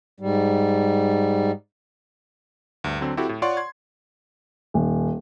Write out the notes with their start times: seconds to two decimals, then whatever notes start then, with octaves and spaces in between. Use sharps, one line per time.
0.20 G#2 G3
2.84 D2 G2
3.01 D3 F#3 C4
3.17 C4 E4 F#4 G4 A4
3.29 A2
3.42 F4 C#5 D5 F#5 C6 C#6
3.57 C6 G#6
4.74 D#1